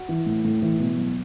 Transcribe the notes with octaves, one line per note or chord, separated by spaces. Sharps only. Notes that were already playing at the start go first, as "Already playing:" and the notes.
Already playing: F#4
E3
A2
A2
E3
B2
F#3